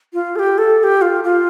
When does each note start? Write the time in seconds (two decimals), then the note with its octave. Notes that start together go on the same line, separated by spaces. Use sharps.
0.14 F4
0.36 A4
0.39 G4
0.58 A4
0.80 A4
0.83 G4
1.02 F4
1.24 F4